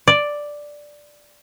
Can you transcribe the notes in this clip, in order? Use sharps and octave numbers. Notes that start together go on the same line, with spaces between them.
D5